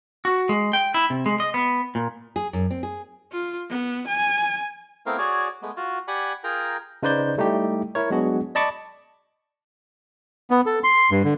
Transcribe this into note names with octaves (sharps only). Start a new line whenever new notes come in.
F#4
G#3
G5
E4
C3
G#3
D#5
B3
A#2
G#4
F#2
C4
G#4
F4
B3
G#5
A3 B3 C4 E4 A#4 F5
F#4 G#4 C#5 D5
G#3 A3 B3
F4 F#4
G4 D5 F#5 G#5 B5
F4 G#4 A#4 G5 A#5
C#3 D#4 B4 C5 D5 G6
G3 A3 D#4 E4 G4
E4 A#4 C#5
F#3 G#3 B3 D4 F#4 G#4
D5 D#5 A5 B5 C#6 D6
B3
A4
C6
G2
D3